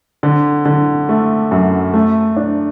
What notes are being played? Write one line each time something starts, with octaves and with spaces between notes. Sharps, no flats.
D3
D3
A3
F#2
A3
D4